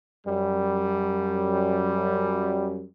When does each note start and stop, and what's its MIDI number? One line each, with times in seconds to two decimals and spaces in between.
0.27 2.86 42
0.27 2.86 55